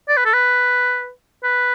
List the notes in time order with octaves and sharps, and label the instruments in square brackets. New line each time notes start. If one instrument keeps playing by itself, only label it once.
[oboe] D5
B4
A4
B4
B4